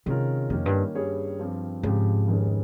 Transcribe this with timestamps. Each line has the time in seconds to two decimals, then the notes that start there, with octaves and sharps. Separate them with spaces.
0.06 C3 D#3 G#3 C#4 F4 A#4
0.50 F2 D#3 A#3 C#4
0.66 G2
0.95 G2 G3 C#4 G#4 C#5
1.39 G2 F3 C4 G4
1.83 G#2 C#3 F3 C4 G4
2.28 F1 D#2 D#3 G#3 C#4